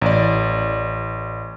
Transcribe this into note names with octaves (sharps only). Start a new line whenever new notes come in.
A1 D5